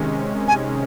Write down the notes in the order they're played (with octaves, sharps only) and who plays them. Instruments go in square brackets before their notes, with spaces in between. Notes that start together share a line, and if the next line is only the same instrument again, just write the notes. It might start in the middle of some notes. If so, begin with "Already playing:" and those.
Already playing: [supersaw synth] C3 D#3 G#3 C#4
[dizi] G#5